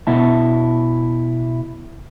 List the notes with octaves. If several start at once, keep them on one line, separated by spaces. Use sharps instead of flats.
B2 E4 A5